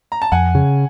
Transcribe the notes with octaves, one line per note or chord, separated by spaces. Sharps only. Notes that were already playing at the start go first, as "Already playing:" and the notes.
A#5
A5
F2 F#5 G#5
C#3